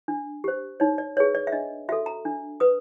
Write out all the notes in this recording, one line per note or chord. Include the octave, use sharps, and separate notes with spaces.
D4
G4 C5
D#4 C#5
D5
G#4 B4 C#5
D5
E5
D4 D#5
F#4 A4 E5
A#5
D4
B4 D#6